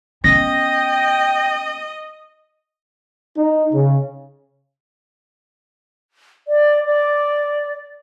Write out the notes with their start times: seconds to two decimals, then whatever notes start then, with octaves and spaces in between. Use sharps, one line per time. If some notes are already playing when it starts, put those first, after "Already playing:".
0.24 B3 C#4 D#5 G5 A#6
3.36 D#4
3.73 C#3
6.48 D5
6.85 D5